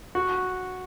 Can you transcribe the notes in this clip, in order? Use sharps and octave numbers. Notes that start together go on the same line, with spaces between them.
F#4